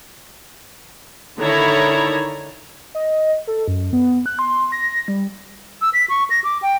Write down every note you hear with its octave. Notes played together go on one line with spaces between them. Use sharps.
D3 D#3 E4 C#5 A#5
D#5
A4
F#2
B3
F#6
C6
A#6
G3
E6
B6
C#6
A#6
D6
G5